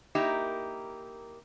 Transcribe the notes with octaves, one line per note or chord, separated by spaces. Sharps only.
A#3 D#4 E4 G4 A#4